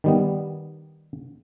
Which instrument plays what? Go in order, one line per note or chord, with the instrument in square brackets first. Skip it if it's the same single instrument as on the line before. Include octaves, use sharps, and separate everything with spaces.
[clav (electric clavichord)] D#3 G3 B3